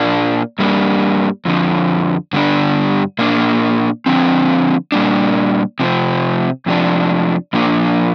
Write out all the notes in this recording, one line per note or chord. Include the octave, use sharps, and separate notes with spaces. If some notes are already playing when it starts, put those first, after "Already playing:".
Already playing: A#2 A#3 D4
G2 G3 A#3 D4
F2 D3 F3
G2 D3 G3 D4
A#2 A#3 D4
D3 F3 C4
A#2 G3 A#3 D4
C3 F3 C4
F2 C3 F3 D4
A#2 F3 A#3 D4